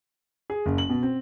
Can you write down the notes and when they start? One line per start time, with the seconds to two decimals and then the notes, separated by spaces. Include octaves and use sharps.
0.50 G#4
0.66 F#1
0.78 F#7
0.90 B2
1.03 C4